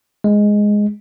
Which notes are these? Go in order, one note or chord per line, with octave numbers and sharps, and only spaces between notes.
G#3